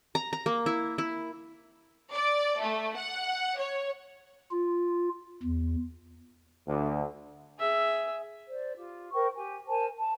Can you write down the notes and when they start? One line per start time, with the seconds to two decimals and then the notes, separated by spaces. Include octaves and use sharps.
0.15 A#5
0.33 A#5
0.46 A#3
0.66 E4
0.98 E4
2.12 D5
2.60 A3
2.94 F#5
3.58 C#5
4.51 F4
5.43 E2
6.67 D2
7.59 G#4 E5
8.48 C5 D5
8.75 F4 G4
9.12 A#4 C5 G5 C#6
9.35 G4 G#5
9.67 A#4 C5 G#5 A5
9.97 A5